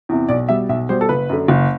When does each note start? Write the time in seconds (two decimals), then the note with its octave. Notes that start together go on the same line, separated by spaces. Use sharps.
0.09 E2 C3
0.29 B1 D5
0.48 B2 G3 E5
0.69 B1 E5
0.89 B2 G3 C5
1.01 A4
1.09 F#1 B4
1.29 F#2 D3
1.48 F#1